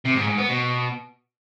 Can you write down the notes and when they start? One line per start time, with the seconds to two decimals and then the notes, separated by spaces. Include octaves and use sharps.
0.05 C3
0.16 G#2
0.27 G#2
0.38 B3
0.49 B2